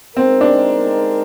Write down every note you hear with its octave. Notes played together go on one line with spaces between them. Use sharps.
G#3 C4 D#4 G4 A#4
D4